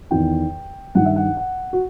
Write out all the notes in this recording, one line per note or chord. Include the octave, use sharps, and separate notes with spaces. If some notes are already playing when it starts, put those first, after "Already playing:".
E2 D#3 G5
G2 D#3 F#5
E5
F#5
F#5
F#4